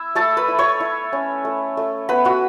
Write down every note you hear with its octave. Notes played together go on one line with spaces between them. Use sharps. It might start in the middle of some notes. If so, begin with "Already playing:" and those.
Already playing: E4 E5
A3 A4 A5
B4 B5
E4
C#5 C#6
E4
C#4
A3
A3
B3 B4 B5
F#4 F#5